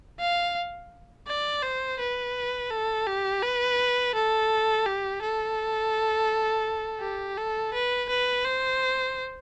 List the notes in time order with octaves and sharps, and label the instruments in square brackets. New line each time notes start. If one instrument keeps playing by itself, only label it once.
[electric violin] F5
D5
C5
B4
A4
G4
B4
A4
G4
A4
G4
A4
B4
B4
C5